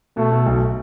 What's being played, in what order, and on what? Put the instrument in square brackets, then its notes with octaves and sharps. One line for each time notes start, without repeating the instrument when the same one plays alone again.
[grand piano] B2 [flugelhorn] A3
[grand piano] B2
B1